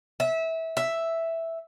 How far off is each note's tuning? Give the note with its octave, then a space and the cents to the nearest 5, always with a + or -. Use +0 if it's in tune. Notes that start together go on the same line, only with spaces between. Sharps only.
E5 -20
E5 +0